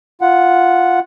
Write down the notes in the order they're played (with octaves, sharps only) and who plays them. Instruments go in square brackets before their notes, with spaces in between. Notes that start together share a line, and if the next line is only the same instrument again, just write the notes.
[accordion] F4 F#5